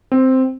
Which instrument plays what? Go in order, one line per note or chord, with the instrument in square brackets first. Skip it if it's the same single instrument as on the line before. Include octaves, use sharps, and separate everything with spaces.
[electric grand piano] C4